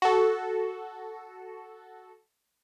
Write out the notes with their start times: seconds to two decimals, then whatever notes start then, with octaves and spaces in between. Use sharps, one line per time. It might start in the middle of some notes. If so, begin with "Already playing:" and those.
0.02 F#4 A4